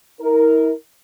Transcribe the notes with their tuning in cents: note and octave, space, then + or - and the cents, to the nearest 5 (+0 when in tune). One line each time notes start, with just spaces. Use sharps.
E4 -45 A#4 +0